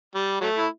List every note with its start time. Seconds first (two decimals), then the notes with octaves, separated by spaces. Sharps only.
0.15 G3
0.41 F#3 A3
0.57 E4